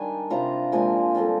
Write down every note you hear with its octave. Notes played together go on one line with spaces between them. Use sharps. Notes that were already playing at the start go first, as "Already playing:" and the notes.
Already playing: D#3 G3 D4 G#5
C3 G3 D4 F4 A#5
A#2 F3 G#3 C4 G#5
D3 G3 C4 F4